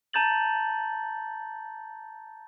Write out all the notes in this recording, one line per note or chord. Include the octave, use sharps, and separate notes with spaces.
A5 A#5 G6 A6 F#7